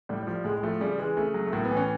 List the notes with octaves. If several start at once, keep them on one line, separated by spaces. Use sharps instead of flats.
A2 G3
F3 G3
A2 G#3
G#3
F3 A3
C#3 G3
E3 G#3
C#3 A3
F#3
A3
A2 A#3
B3
E3
C#4